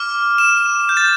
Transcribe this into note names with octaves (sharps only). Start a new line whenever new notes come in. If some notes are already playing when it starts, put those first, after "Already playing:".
Already playing: D6 F6
E7
G6
A6